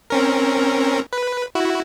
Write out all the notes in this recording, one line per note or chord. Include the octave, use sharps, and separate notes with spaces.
C4 C#4 A#4
B4
E4 F#4